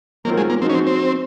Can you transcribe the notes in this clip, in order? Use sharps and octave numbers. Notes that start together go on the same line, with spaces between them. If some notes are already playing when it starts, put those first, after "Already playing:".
D#3 F#3 A#3 C4 F4 A#4
G#3
A#3
F3 G#3 C4 D#4 F#4
C#4
C4
C4